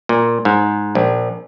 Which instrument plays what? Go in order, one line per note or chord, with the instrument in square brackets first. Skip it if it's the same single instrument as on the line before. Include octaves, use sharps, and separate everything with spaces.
[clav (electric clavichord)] A#2
G#2
A#1